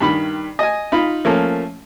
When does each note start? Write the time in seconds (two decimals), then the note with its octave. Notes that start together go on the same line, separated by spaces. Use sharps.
0.01 G2 D#3 B5
0.59 D#5 G#5
0.92 D#4 F4 B5
1.25 F3 A3 A#3 C#4